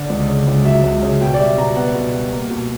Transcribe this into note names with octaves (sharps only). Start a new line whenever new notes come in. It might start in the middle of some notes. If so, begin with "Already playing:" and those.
Already playing: D3 D5
C#2
C#3
C#2
F#3 E5
C#2
C#3
B2 G5
D5
G3 E5
B2 A#5
B3 F#5
B2
G3
A#3
B2